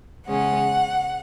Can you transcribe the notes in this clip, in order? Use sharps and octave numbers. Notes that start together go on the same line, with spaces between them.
E2 C#3 G#3 C#4 F#5